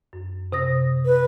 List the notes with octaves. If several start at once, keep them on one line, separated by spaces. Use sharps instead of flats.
F#2
C3 D#6 A#6
B4